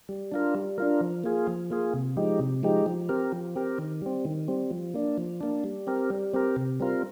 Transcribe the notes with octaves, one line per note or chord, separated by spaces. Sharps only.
G3
D4 F4 A#4
G3
D4 F4 A#4
F3
A#3 F4 G#4
F3
A#3 F4 G#4
C3
F3 G#3 D#4 G4
C3
F3 G#3 D#4 G4
F3
C4 G4 A#4
F3
C4 G4 A#4
D#3
G3 C4
D#3
G3 C4
F3
A#3 D4
F3
A#3 D4
G3
C4 G4 A#4
G3
C4 G4 A#4
C3
G3 C4 F4 A#4